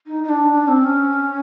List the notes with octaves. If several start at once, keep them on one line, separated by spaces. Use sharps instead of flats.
D#4
D#4
D4
D4
C4
C#4